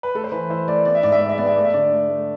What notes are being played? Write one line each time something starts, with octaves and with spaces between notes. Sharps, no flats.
B4
A3 A4
C5
E3 B4
E4 C5
A3 D5
B3 D5
E5
G#2 D5
E5
G#3 D5
E5
B3 D5
E5
A3 D5
E5
D3 D5
A3
A3